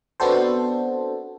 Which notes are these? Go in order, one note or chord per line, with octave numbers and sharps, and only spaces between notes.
B3 C4 D4 F#4 A4 C5